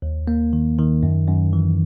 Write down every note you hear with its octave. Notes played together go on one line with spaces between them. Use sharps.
D#2
A#3
D#3
D#3
F#2
F#2
E3